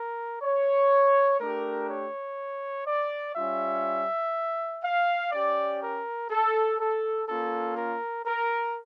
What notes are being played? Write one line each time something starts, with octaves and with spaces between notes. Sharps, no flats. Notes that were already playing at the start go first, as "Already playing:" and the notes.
Already playing: A#4
C#5
A3 D4 G4 A#4
C#5
D5
G3 C#4 F4 E5
F5
C#4 G4 D5
A#4
A4
A4
A#3 C#4 F4 A4
A#4
A#4